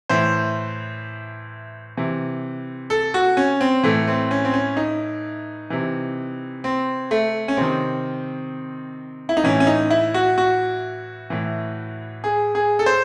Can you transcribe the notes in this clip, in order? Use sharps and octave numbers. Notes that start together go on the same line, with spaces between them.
A2 E3 C5
C3 E3
A4
F#4
C#4
C4
A2 E3 A3
C4
C#4
C4
C#4
D#4
C3 E3
C4
A3
C#4
C3 D#3 C4
E4
D#4
A2 E3 C#4
C#4
D#4
E4
F#4
F#4
A2 E3
G#4
G#4
A4
C5